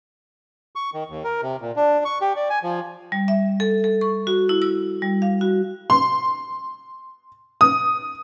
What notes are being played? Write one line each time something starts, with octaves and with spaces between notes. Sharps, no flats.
C#6
D#3
D#2
A#4
C3
A#2
D4
C#6
G4
D5
G#5
F3
G3
E5
A4
A4
C#6
F#4
E4
E6
G3
F5
F#4
C6
D#6